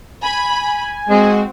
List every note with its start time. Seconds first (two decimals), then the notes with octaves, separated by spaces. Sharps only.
0.22 G#5 B5
1.09 G#3 C4 F#4